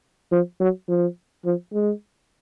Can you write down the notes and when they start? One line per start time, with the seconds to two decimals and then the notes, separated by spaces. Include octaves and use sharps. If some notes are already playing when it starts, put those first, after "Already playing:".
0.32 F3
0.60 F#3
0.89 F3
1.45 F3
1.74 G#3